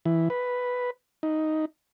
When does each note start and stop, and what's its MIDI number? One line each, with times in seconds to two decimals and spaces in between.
0.05 0.29 52
0.30 0.90 71
1.23 1.65 63